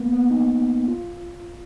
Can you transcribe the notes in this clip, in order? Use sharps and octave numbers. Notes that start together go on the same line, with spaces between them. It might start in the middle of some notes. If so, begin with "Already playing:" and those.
Already playing: A#3 B3
B3
D#4
F4